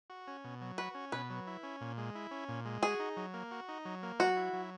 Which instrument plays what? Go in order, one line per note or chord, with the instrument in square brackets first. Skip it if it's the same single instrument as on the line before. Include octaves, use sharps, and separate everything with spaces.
[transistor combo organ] F#4
C#4
B2
F#3
[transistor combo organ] F#4 [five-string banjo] B4
[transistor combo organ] C#4
[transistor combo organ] B2 [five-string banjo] B4
[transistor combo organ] F#3
E4
C#4
A#2
G#3
E4
C#4
A#2
G#3
[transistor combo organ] F#4 [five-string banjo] G#4
[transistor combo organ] D#4
F#3
A#3
F#4
D#4
F#3
A#3
[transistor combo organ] F#3 [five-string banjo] F#4
[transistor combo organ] E4
F#3